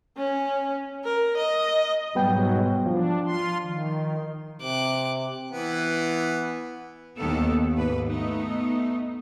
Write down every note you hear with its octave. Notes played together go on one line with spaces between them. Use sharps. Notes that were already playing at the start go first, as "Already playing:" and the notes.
C#4
A#4
D#5
G#2 B2 F#3 G3 B3 G5
F3 D4
F4 C6
D#3
C3 D6 F#6
E3 B3
D#2 D#3 B3 A4
D#2 G#2 B4
A3 B3 D#4